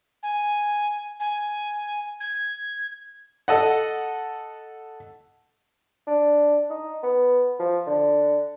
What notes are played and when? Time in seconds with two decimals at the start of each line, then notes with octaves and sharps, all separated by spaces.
0.23 G#5
1.20 G#5
2.20 G#6
3.48 A4 D#5 F#5
6.07 D4
6.70 D#4
7.03 B3
7.60 F3
7.87 D3